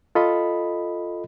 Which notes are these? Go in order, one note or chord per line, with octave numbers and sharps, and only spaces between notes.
F4 A4 D#5 B5